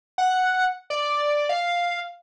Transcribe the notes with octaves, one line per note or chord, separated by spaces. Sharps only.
F#5
D5
F5